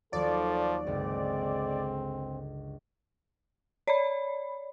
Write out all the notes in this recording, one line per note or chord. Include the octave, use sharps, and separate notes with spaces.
D#2 F3 F#3 A4 D5 C#6
G1 C#2 G#3 C4
C#5 D5 B5